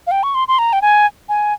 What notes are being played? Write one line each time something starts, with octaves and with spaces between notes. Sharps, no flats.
F5
G5
C#6
C6
C6
A#5
G5
G#5
G#5